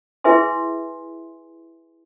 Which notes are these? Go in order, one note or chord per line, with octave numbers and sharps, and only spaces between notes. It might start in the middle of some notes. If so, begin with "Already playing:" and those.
E4 G#4 B4 E5 G#5 C6